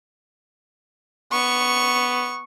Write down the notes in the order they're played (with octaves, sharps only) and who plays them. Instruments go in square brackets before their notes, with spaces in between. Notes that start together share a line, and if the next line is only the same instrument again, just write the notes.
[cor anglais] B3 [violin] C#6